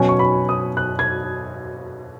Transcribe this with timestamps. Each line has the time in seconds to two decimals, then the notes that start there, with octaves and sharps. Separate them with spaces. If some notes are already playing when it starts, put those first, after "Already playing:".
Already playing: B2 F#3 C#4 G#5
0.09 C#6
0.19 B5
0.49 D#6
0.77 F#6
0.99 G#6